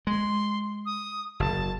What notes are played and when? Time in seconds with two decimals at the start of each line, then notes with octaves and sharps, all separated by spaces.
0.07 G#3 C6
0.85 D#6
1.40 F#1 A5